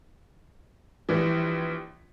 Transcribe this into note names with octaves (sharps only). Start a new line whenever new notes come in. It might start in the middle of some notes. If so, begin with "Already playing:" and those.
A#1 E3 G3